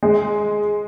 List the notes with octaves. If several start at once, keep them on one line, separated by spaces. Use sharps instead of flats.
G#3